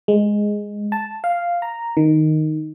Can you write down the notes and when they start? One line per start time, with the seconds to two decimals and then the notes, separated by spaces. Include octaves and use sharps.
0.08 G#3
0.92 A5
1.24 F5
1.62 A#5
1.97 D#3